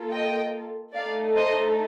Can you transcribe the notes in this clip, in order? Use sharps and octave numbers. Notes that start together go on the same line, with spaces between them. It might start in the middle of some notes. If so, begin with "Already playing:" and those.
Already playing: A#3 F4 A4
D#5 G5
A3 D#4 A4 D5 F5
C5 D#5